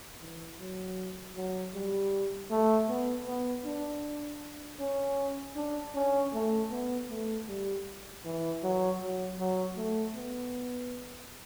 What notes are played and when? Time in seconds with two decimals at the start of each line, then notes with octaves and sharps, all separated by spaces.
0.21 E3
0.59 F#3
1.36 F#3
1.74 G3
2.50 A3
2.89 B3
3.27 B3
3.65 D4
4.79 C#4
5.56 D4
5.95 C#4
6.34 A3
6.71 B3
7.09 A3
7.48 G3
8.25 E3
8.63 F#3
9.01 F#3
9.39 F#3
9.77 A3
10.16 B3